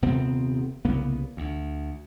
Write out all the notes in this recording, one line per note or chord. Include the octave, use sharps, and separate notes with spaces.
D#1 C3 B3 C4
C2 C#3 A#3 B3
D2